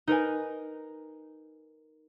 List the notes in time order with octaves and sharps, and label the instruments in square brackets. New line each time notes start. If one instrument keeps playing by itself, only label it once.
[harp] D#4 A#4 B4 G#5